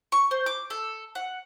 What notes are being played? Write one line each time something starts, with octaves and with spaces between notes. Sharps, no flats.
C#6
C5
D6
A4
F#5